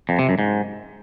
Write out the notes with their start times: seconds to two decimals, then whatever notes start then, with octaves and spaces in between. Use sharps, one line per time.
0.09 F2
0.19 C3
0.29 F#2
0.39 G#2